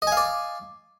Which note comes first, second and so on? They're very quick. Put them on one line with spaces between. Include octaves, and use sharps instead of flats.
D#5 G#5 F5 D5